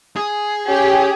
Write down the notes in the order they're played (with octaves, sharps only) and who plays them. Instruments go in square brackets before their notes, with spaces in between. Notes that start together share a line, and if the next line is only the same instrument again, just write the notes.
[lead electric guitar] G#4
[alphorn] C#4 [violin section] G4